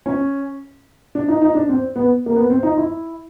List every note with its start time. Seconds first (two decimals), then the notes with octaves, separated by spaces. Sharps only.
0.06 C#4
1.15 D4
1.28 D#4
1.42 D#4
1.55 D4
1.69 C4
1.96 B3
2.26 A#3
2.36 B3
2.50 C4
2.63 D#4
2.77 E4